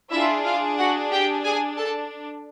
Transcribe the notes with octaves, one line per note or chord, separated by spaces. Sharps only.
D4 E4 F4 G#4 E5
F4 F5
F#4 F#5
G4 G5
G#4 G#5
A4 A5